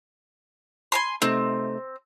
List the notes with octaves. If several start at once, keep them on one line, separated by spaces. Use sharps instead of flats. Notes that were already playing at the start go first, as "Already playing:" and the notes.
G#5 A5 C6
C3 A3 C4 D#4